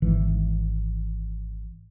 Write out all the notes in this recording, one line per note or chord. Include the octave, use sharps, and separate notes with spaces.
G#1 E3